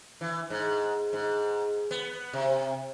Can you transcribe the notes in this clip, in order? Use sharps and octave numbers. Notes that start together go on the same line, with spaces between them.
E3
G#2
G#2
B3
C3